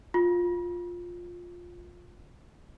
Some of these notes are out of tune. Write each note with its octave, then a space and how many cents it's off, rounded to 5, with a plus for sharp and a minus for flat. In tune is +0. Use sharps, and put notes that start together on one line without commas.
F4 +10